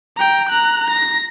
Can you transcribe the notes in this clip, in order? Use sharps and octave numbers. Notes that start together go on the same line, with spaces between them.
G5 A#5
A#5 F#6
A#6